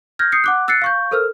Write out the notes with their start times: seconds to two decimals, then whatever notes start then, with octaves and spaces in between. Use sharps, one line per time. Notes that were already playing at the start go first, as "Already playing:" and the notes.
0.19 F6 G6 G#6 A#6
0.32 D#6 G6 C7 C#7
0.44 F#5 D6 F#6
0.68 E6 F#6 A6 C7 C#7
0.82 F5 C#6 G6
1.11 A4 A#4 C5 E6 F6